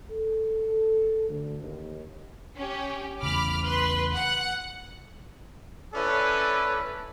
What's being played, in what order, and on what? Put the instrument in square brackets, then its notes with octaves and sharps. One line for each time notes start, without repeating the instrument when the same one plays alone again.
[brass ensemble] A4
D2
D#2
[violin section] C#4 G4
[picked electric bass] E2 C#3 [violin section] B5 D6 F6
[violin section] B4 C6
F#5
[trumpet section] C#4 E4 A4 B4 D5